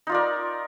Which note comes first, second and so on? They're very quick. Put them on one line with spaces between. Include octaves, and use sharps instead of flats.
D#4 F4 D5 A#4